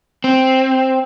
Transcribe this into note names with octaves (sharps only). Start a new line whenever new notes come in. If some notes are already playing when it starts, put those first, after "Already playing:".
C4